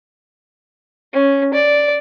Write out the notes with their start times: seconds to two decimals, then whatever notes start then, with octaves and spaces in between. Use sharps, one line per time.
1.13 C#4
1.53 D5